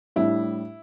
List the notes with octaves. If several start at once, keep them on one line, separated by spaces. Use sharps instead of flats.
A2 G3 D4 E4